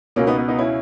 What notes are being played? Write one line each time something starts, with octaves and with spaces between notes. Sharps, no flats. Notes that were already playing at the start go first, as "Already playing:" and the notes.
C#2 B2 A#3 C#4
B3 D#4
B3
B3 D#4
C#4 E4